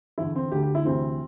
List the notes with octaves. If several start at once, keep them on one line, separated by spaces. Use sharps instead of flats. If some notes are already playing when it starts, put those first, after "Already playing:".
E2 D3 E4
C4
D2 D3 G4
G4
E4
D2 C3 E3 C4